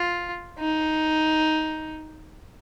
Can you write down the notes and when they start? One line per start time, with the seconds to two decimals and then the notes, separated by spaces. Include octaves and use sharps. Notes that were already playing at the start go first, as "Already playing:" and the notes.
Already playing: F4
0.60 D#4